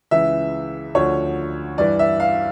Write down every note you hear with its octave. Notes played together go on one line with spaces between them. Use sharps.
C#2 C#3 E3 E5
D2 D3 F3 C#5
G2 E3 D5
E5
F5